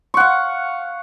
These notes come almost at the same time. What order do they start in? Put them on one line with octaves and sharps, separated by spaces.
C#6 F#5 F5